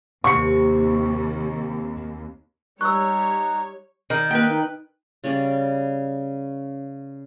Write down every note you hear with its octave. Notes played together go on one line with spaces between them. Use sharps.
D#2 C3 C#6 C#7
G3 D#4 C#5 C#6 E6 F#6
D#3
A#3 B4 G5
D#4
C#3 G3 C#4 D5